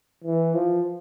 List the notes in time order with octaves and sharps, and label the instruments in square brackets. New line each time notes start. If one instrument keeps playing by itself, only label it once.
[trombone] E3
F3